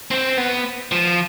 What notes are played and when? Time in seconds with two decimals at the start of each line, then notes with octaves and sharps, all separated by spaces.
0.11 C4
0.37 B3
0.92 F3